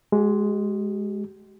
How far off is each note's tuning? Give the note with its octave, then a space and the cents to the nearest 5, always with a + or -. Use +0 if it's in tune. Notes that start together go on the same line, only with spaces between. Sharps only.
G#3 +5 G4 -45